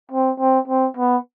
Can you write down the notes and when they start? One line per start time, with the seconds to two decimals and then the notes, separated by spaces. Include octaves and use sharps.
0.11 C4
0.39 C4
0.68 C4
0.97 B3